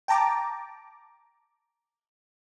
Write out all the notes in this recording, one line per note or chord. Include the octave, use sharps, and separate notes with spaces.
G5 A5 A#5 D6